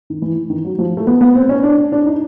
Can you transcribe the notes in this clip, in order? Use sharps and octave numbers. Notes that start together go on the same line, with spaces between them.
D#3
E3
D#3
F#3
F3
A3
B3
B3
C4
C#4
D4
D4
D#4